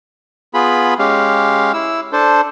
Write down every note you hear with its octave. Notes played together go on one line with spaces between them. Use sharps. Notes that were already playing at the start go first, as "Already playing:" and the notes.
B3 F4 G#4 B5
G#3 C#4 G4 F5
E4 E6
D4 A4 C5